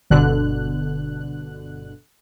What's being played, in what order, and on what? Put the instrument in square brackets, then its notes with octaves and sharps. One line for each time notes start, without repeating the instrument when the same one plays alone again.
[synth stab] G1 B2 D3 F#6